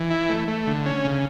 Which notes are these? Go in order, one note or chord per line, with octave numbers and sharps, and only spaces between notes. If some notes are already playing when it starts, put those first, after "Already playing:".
Already playing: E3
E4
A3
A3
D3
C#4
C#3